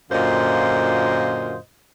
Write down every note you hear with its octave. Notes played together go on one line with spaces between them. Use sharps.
F#2 A#2 D3 F4 C5 D#5